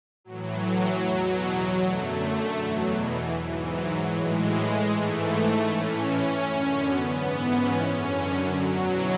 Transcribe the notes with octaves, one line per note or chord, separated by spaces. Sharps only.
A2 E3 F#3
E2 B2
F#2 D3 A3
E2 B2 F#3
E3
G#2 E3
F#3
A2 E3 G#3
G#2 E3 A3
A2 E3 C#4
F#2 D3
B3
G#2 E3
C#4
F#2 D3 C#4
F#3
E2 B2